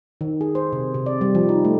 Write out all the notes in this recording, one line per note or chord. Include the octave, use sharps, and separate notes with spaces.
D#3
G#4
C5
C3
C3
D5
G3
F3
D#4
A3